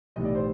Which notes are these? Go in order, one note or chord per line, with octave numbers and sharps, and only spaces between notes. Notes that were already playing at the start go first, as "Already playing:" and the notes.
B1 A2 E3 G3 D#5
D5
C5